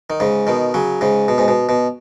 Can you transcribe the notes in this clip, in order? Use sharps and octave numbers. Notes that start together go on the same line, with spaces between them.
D#3
G#2 C#3
B2 D#3
C#3 F#3
G#2 C#3
B2
G#2
B2
B2